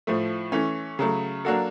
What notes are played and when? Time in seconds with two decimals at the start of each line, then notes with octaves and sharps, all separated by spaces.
0.07 A2 F3 A3
0.52 E3 A3 C#4
0.99 C#3 F#3 A3
1.45 F#3 A#3 D4 F#4 A4